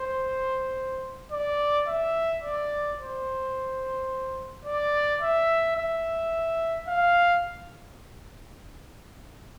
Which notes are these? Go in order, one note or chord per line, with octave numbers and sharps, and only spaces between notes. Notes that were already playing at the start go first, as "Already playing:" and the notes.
Already playing: C5
D5
E5
D5
C5
D5
E5
E5
F5